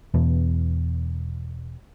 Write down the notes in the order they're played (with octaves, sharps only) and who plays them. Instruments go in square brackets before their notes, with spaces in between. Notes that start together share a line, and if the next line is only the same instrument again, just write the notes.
[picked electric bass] E1 E2 B2